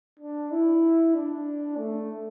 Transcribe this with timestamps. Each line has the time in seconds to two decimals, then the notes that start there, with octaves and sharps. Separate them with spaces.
0.20 D4
0.51 E4
1.14 D4
1.77 A3